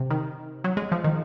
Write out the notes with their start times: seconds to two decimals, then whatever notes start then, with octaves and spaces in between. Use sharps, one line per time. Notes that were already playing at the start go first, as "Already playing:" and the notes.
Already playing: C3
0.10 D#3
0.64 F#3
0.77 G#3
0.92 F3
1.04 D#3